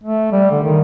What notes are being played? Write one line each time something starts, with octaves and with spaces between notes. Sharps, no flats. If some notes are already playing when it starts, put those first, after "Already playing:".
A3
G3
D3
D#3